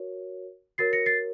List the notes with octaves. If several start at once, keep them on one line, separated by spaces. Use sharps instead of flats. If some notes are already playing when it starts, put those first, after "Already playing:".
Already playing: F#4 A#4 C#5
F#4 A#4 C#5 A6 C7
A#6 C#7
A6 C7